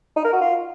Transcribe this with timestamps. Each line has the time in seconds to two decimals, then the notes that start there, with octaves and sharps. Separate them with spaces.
0.16 D#4
0.25 A#4
0.33 F#4
0.41 F4